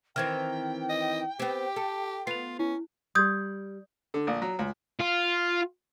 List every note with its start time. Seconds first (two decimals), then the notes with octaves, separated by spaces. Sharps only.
0.16 D#3 E3 C4 G5 F6 G#6
0.89 D#5
1.39 B3 C4 G4
1.76 A4
2.27 B3 F4 C7 F7
2.59 C#4 E4
3.15 G3 G4 D#6 G6 G#6
4.14 D3
4.27 A#1
4.42 F#3
4.59 C#2
5.00 F4